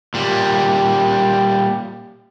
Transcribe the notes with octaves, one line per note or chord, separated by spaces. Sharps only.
A#2 G3